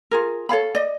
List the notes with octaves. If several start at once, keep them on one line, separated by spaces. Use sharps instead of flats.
F4 G#4 A#4
A4 C#5 F5 B5
D5 D#5